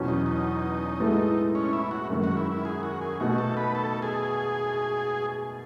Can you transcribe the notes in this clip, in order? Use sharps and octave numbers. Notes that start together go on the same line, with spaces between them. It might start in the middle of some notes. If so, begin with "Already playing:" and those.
Already playing: E2 B2 F#3 C#4
D#4
D#4
A2 G#3 B3 E4 A4
C#4
E4
F#4
F#2 D#3 G#3
F#4
E4
E4
G#4
F#4
G#4
B2 A3 D#4 F#4
A4
B4
A4
G#4